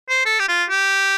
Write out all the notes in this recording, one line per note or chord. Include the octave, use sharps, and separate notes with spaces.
C5
A4
G4
F4
G4